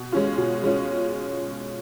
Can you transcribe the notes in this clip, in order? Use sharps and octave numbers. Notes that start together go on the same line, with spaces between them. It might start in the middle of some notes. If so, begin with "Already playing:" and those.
Already playing: B2
G#3 C#4 F4
B2
G#3 C#4 F4